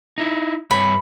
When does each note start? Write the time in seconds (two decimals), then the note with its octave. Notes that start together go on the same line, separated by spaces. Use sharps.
0.18 D#4 E4
0.71 G2 G3 C#5 B5